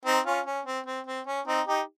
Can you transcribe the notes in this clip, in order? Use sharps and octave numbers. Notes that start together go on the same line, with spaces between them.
C4 D#4
C#4 F4
C#4
C4
C4
C4
C#4
C4 D#4
D#4 G4